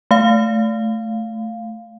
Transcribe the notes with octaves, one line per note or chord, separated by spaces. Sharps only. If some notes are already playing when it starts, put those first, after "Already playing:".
A3 F5